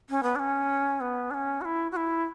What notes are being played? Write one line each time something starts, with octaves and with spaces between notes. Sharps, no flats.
C#4
B3
D4
C#4
B3
D4
C#4
F#4
E4
F#4
E4